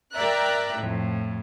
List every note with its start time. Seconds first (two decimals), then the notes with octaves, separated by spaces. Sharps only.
0.15 A#4 D5 E5 G5 A#5 F#6
0.79 F2 A2